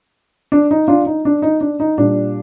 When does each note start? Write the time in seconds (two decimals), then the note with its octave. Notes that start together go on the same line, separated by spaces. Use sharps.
0.52 D4
0.71 D#4
0.88 D4 F4
1.06 D#4
1.25 D4
1.42 D#4
1.61 D4
1.80 D#4
1.98 A#2 G3 D4